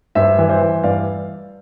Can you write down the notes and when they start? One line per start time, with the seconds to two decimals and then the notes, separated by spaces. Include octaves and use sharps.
0.15 G2 C5 E5
0.38 E3
0.49 C5 E5
0.61 E3
0.83 G2 D5 F5